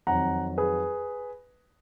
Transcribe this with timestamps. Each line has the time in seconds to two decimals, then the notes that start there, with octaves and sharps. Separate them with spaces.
0.07 F2 D#3 F#3 F#5 A#5
0.58 G#4 B4